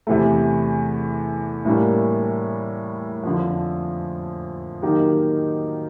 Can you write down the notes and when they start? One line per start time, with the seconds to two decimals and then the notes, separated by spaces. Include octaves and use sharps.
0.07 E2 C3 E3 A3
1.65 A2 E3 G3 A#3 D4
3.24 F2 D3 F3
4.82 D#3 F#3 A#3 D#4 G4